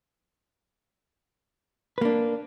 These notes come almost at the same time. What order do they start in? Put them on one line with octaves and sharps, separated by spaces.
B4 A#3 D4